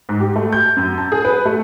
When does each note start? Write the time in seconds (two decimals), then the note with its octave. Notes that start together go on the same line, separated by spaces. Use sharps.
0.09 G#2
0.20 G4
0.36 A3
0.52 G6
0.77 F#2
0.98 A5
1.12 G#4
1.25 B4
1.45 A3